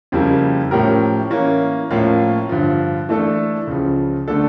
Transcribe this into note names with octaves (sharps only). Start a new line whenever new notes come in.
F2 C#3 G3 A#3 E4
A2 F3 C#4 G4 A#4
E3 A#3 C#4
A2 F3 A#3 C#4 F4
G2 D3 F3
E3 A3 D4 A4
C#2 C#3 F3
D3 A3 D4 A4